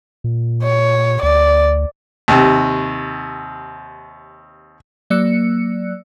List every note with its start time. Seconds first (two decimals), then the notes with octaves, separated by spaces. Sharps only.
0.24 A#2
0.64 C#5
1.23 D2 D5
2.28 D#2 C3
5.10 F#3 A#3 D5 E6 F#6 C#7